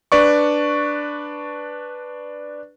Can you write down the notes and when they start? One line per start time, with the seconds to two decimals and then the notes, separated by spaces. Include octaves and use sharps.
0.12 D4 B4 D5 C#6